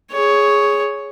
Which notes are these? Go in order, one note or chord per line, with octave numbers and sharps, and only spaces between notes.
G#4 C#5